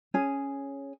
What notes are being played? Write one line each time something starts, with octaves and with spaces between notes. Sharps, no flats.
C#4 G#4